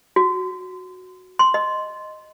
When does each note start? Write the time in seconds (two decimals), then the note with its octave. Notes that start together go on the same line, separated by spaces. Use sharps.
0.16 F#4
1.39 C6
1.54 D#5